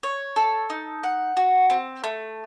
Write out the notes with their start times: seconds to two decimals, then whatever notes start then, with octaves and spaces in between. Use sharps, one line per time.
0.03 C#5
0.36 A4
0.70 D#4
1.03 F#5
1.37 F#4
1.70 C4
2.04 A3